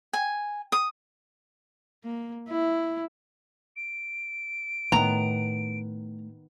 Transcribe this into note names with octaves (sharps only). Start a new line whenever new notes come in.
G#5
D#6
A#3
E4
D7
A2 D#3 A3 B3 A#5